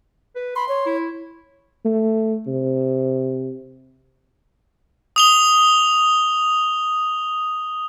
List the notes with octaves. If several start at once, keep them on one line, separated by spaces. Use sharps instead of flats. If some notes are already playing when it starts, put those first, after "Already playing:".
B4
B5 C6
C#5
E4
A3
C3
D#6 F7 G7